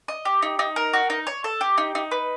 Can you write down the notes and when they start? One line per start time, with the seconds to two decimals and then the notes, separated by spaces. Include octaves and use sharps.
0.08 D#5
0.25 G4
0.42 D#4
0.59 D#4
0.76 A#4
0.93 F#4
1.10 D#4
1.27 C#5
1.44 A4
1.61 G4
1.78 D#4
1.95 D#4
2.11 B4